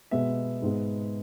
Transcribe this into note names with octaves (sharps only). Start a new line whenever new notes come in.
B2 G#3 B3 E5
G#2 G#3 B3